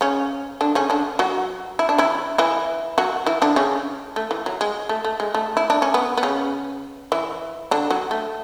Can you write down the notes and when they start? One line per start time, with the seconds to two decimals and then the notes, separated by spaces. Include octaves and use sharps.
0.01 C#3 C#4
0.61 D3 D4
0.75 C#3 C#4
0.90 D3 D4
1.19 F#3 F#4
1.79 E4
1.89 D4
1.98 E3 E4
2.38 E3 E4
2.98 F#3 F#4
3.27 E3 E4
3.42 D3 D4
3.56 C#3 C#4
4.16 A3
4.31 E3
4.46 F#3
4.61 G#3
4.89 A3
5.05 A3
5.20 G#3
5.35 A3
5.57 E4
5.70 D4
5.82 C#4
5.94 B3
6.17 B3
6.23 C#3 C#4
7.12 E3 E4
7.71 D3 D4
7.90 F#3 F#4
8.11 A3